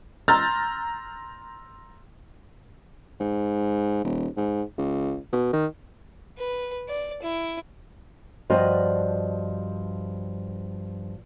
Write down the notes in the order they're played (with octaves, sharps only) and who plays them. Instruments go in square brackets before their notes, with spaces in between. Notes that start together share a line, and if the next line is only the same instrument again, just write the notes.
[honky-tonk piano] A#5 C6 E6 F6 G6 A6
[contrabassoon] G#2
D#1
G#2
C#2
B2
D#3
[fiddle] B4
D5
E4
[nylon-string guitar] G2 F3 F#4 D5 D#5